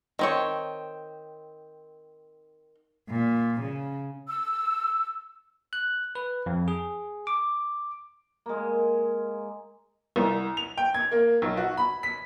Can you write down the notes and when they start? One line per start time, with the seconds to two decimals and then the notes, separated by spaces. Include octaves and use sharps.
0.19 D#3 C4 C#5
3.09 A#2
3.60 C#3
4.27 E6
5.73 F#6
6.15 B4
6.46 F2
6.68 G#4
7.27 D6
8.46 G#3 A#3
10.16 C2
10.57 F7
10.77 G5
10.94 G#6
11.12 A#3
11.42 B1
11.57 F#4
11.77 B5
12.03 B6